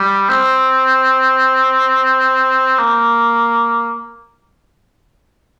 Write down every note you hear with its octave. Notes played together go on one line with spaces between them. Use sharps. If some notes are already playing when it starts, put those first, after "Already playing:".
Already playing: G3
C4
A#3